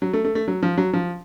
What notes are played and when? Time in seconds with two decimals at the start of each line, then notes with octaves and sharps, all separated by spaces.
0.02 F#3
0.13 A3
0.24 A3
0.35 A3
0.48 F#3
0.63 F3
0.77 F#3
0.93 F3